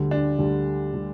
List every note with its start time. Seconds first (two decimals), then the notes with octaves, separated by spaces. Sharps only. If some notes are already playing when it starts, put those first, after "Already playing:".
Already playing: D2 D3 G3
0.11 D4
0.38 D2 D3 G3
0.93 D3 G3